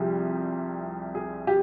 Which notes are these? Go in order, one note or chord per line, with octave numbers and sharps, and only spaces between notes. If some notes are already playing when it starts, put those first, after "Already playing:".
Already playing: C2 C3 F3 G4 G#4
G#4
G4